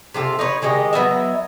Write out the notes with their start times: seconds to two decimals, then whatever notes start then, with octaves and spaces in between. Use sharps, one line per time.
0.14 C3 F4 G4 A4
0.39 D#4 B4 C#5
0.62 D#3 G#3 G4 D#5
0.93 F#3 B3 D#5 E5